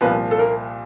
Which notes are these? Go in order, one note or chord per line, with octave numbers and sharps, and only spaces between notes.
C2 A#2 F3 B3 B4
A4
A#3 A#4